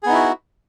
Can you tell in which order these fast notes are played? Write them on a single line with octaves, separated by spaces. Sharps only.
G#4 B3 D#4 E4 F#4